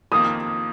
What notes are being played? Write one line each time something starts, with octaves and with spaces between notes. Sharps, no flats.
F2 D#3 A#3 F4 D#6